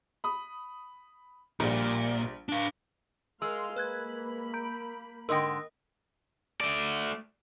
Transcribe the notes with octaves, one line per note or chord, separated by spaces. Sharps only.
B5 D#6
A#1 A#2 G3
D4 F5
G#3 A#4 F5 C6 E6
A#3 B4 B5 F#6 G#6
A#5 G6 D7
G#2 D3 A#4 D#5 G5 D#6 E6 A#6
A3 D5